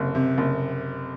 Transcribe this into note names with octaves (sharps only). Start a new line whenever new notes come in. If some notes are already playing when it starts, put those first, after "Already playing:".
Already playing: F#1 C3
C3
F#1